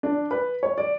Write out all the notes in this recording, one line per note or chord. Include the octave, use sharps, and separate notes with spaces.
D4
B4
C#5
D5